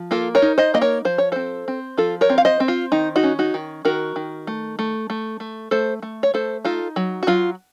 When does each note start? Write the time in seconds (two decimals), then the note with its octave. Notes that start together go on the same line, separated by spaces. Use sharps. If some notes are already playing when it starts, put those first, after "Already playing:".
Already playing: F3
0.11 A#3 F4 A4
0.35 A#4 C#5
0.42 D#4
0.58 C5 D#5
0.74 A#3 D#5
0.81 A#4 C#5
1.05 F3 C5
1.18 C#5
1.32 C4 A4 C5
1.68 C4
1.97 F3 F4 A4
2.21 A#4 C#5
2.30 C4
2.38 F5
2.45 C5 D#5
2.60 C4
2.68 F4
2.92 D#3 D#4
3.16 D#4 F#4
3.23 C#4
3.39 D#4 F#4
3.54 D#3
3.85 D#3 F#4 A#4
4.16 D#3
4.47 A3
4.79 A3
5.10 A3
5.40 A3
5.71 A3 A4 C5
6.02 A3
6.23 C#5
6.34 A3 A4 C5
6.65 D#4 F4 A4
6.96 F#3
7.23 F#4
7.27 F#3 F4